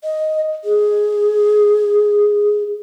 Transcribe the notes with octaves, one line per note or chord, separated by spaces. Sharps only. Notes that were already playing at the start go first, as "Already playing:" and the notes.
D#5
G#4